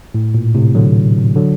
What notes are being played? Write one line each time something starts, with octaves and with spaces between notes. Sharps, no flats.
A2
A#2
A2 C3
D3 F#3
D3 F#3